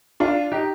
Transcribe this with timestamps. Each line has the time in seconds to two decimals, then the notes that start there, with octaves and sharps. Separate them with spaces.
0.20 D4 F4
0.52 D#4 G4